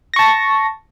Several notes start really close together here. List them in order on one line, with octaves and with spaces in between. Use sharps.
A#6 C#6 A5